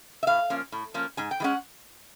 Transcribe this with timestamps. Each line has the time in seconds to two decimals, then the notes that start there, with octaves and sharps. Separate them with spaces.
0.23 E5
0.27 A2 F5
0.50 F3 A#3 C#4
0.72 A2
0.94 F3 A#3 C#4
1.17 G#2 G#5
1.31 G5
1.40 E3 G#3 C#4 F#5